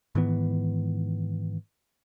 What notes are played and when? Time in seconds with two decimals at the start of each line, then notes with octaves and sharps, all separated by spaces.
0.15 G#2 D#3 E3 B3